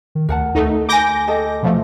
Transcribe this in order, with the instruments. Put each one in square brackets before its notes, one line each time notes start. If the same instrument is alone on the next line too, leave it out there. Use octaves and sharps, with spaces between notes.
[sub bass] D#3
[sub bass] D2 [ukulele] A#4 F#5 A5
[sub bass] D2 [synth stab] A3 D#4
[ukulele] G#5 B5 [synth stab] D6 G6 A#6
[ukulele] A4 D#5 G5
[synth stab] B2 F3 A3